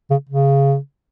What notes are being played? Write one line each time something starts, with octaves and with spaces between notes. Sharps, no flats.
C#3
C#3